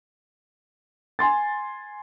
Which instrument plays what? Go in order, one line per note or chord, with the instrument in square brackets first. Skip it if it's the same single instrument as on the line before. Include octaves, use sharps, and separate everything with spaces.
[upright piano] G#5 C6 A6